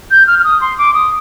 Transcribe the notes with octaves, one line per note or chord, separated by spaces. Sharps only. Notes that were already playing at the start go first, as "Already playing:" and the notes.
G6
F6
F6
D#6
C6
D6
D#6